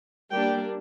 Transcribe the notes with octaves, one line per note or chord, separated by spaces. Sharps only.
G3 A#3 D4 G4 G5